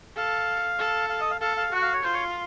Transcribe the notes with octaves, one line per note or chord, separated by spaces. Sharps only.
A4 F5
A4
F5
D#5
F5
A4 F5
F5
F#4 F#5
F5
C#5
F4 C5
C#5